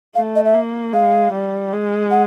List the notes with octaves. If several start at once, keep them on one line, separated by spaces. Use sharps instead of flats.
A3 F5
D#5
E5
A#3
G#3 F5
G3
G#3
F#5